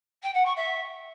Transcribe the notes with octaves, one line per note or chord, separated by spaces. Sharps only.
G5
F#5
C#6
E5